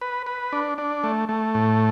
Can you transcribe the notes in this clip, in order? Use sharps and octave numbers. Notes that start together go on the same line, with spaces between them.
B4
B4
D4
D4
A3
A3
A2